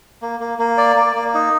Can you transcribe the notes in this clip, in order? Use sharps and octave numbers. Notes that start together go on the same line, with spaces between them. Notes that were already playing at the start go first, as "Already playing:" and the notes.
A#3
A#3
A#3
D5
A#3
A#3
D#4